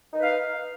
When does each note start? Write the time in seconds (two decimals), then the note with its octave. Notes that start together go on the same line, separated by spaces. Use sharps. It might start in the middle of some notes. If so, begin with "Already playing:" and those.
0.13 D#4
0.18 B4
0.23 F5